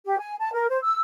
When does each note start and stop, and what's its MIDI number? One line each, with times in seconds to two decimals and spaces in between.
0.06 0.18 67
0.19 0.36 80
0.40 0.53 81
0.53 0.68 70
0.69 0.78 72
0.83 1.01 88